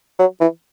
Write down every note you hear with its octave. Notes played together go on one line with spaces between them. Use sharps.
F#3
E3